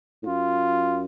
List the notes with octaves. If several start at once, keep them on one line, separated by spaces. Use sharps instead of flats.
A2
F#2 F4